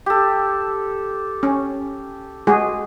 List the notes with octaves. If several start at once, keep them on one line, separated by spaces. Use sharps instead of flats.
G4 A4
C#4
G#3 F#4 G#4